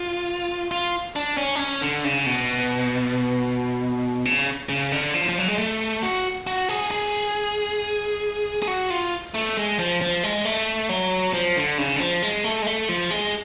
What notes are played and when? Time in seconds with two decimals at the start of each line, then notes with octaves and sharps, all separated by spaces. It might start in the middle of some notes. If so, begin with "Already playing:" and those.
Already playing: F4
0.71 F4
1.16 D4
1.37 C#4
1.55 D4
1.59 C#4
1.81 D3
2.04 C#3
2.26 B2
4.25 C#3
4.69 C#3
4.92 D3
5.14 F3
5.29 F3
5.38 F#3
5.48 G#3
5.58 A3
6.03 F#4
6.47 F#4
6.69 G#4
6.91 G#4
8.62 G#4
8.68 F#4
8.90 F4
9.34 A3
9.57 G#3
9.79 F3
10.02 F3
10.23 G#3
10.45 A3
10.89 F#3
11.34 F3
11.56 D3
11.78 C#3
11.96 D3
12.00 F3
12.22 G#3
12.44 A3
12.62 G#3
12.67 A3
12.89 F3
13.11 G#3